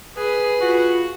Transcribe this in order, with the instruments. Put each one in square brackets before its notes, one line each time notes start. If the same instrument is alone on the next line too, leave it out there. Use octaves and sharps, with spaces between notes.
[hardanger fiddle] G#4 [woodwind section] B4
[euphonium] F4 [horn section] F#4